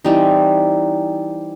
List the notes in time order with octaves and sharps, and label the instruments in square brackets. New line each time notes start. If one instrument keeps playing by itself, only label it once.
[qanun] E3 G3 C4 D#4